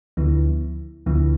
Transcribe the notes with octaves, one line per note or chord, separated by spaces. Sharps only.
D2 D3 F3 B3 E4
D2 D3 F3 B3 E4